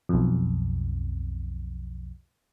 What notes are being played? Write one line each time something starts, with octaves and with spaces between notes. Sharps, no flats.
B1 F2